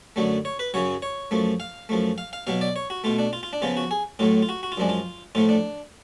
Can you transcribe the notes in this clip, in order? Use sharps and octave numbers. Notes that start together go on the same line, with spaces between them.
F#2 D3 F#3 A3
C#5
B4
F#2 C#3 F#3 C#5
C#5
F#2 F3 A3
F5
F#2 F3 A3
F5
F5
B2 F#3 B3 F5
D5
C#5
F#4
B2 A3 F4
D4
F4
F4
D4
C#3 F3 B3 F4
F#4
G#4
A2 F#3 A3 F4
F4
F#4
F#4
F4
F#2 F3 G#3 D4
F4
A2 F3 A3 F4
D4